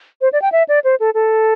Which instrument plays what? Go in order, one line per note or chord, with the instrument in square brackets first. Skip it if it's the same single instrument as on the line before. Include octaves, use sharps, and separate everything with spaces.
[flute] C5
D5
G5
E5
D5
C5
A4
A4